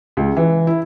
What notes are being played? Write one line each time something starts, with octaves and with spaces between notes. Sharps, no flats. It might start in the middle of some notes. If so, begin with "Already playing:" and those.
C#2
E3
E4